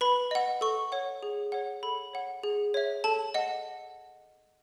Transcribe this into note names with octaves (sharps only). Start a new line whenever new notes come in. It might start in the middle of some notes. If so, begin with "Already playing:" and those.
B4 B5
D#5 F#5
A4 C#6
C#5 F#5
G#4
C#5 F#5
A4 B5
C#5 F#5
G#4
C#5 E5
A4 A5
D#5 F#5